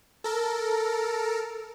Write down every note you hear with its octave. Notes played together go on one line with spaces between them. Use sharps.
A4 A#4